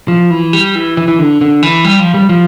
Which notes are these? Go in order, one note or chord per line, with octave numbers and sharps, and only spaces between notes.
F3
E3
G3
E3
E3
E3
D3
D3
E3
G3
F3
G3
F3